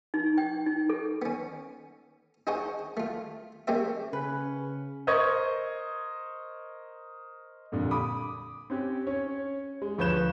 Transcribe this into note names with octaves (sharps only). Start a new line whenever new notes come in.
D#4
G5
D#4
A4
B3 C#4
D4 D#4 G#4 C5 C#5 F#5
A3 F4
G#3 A#3 C#4 G4 C5 E5
C#3 C#4 B4
A#4 C5 D#5 C#6 D#6 G#6
F2 A#2 D3 G3
B5 D6 D#6
C4 C#4 G4
C#4 C#5
G#3
D2 F3 B4 C#5 G6 E7